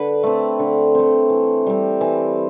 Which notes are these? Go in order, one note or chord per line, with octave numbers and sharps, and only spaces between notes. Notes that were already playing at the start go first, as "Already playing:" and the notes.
Already playing: D3 B4
A3 C4
D3
A3 C4
E3
G3 C4
E3